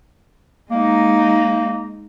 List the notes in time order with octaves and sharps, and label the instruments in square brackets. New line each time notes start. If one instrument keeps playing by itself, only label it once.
[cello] G#3 D#4 [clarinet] A#3